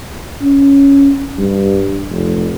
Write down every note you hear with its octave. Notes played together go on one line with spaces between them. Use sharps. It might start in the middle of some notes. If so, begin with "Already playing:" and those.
C#4
G2
F1